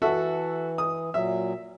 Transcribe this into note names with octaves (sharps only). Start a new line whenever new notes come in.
E3 F#4 A4 E5
D#6
A#2 F#3 E5